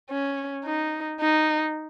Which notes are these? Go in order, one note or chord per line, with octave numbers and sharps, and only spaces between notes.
C#4
D#4
D#4